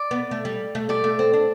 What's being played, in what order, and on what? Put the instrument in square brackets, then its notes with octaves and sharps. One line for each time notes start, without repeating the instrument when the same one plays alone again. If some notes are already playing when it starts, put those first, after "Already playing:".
Already playing: [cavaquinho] D5
[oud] B3
A3
G3
A3
[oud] G3 [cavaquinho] D5
[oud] A3
C4
D4